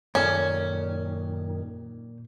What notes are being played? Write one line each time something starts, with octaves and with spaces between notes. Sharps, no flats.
F#2 A#2 D#3 C#4 A4